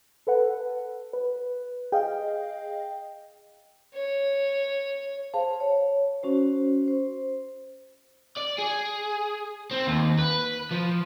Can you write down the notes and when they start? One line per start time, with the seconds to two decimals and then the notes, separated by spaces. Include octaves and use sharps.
0.27 A4 B4 F#5
1.13 B4
1.92 G#4 D#5 F5 G5
3.94 C#5
5.34 G#4 C5 F5 A5
5.60 C#5
6.23 C#4 F#4 C5
6.88 C5
8.37 D5
8.58 G#4
9.71 C4
9.87 D#2
10.19 B4
10.71 F3